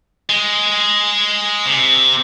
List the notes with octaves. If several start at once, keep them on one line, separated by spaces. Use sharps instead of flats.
G#3
C3